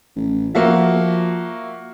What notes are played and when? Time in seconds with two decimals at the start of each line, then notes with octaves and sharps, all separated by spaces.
0.16 A1
0.55 F3 A#3 F#4 E5